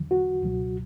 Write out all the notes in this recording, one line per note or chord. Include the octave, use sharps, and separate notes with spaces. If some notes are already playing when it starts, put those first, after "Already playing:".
Already playing: E2 D3 F#3
F#4
C#2 B2 F#3